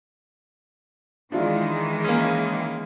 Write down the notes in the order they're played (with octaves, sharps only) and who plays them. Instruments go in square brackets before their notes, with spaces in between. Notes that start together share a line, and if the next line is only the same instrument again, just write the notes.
[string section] D#3 E3 G#3 [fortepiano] D4 E4 F4
[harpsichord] A#3 C#4